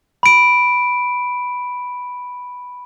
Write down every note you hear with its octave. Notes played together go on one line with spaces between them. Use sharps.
B5 D7